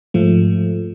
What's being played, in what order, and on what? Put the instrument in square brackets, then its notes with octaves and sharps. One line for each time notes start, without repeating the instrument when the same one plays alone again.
[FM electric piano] G#2 F3 A3